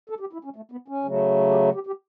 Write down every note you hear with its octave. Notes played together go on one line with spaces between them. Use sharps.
A4
G4
E4
C#4
A3
B3
C#4
C#3 F#3 A3
G4
G4
G4